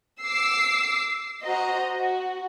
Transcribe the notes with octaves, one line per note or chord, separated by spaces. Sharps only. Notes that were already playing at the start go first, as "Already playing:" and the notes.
D6 E6 C7
F#4 C5 D#5 A#5
F#4